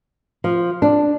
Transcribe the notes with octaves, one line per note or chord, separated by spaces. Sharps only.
F3
D4